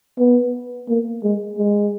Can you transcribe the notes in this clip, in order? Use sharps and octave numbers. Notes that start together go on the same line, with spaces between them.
B3
A#3
G#3
G#3